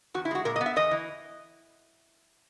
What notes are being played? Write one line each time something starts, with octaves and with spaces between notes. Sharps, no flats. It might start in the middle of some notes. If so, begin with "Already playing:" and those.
E2 F#4
E4
G#3 F#4
A#2 A#4
D#5
B3
E5
E2 D#5
E3